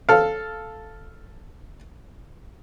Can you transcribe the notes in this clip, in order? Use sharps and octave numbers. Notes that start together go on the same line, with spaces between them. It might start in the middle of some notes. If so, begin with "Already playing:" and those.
A4 F5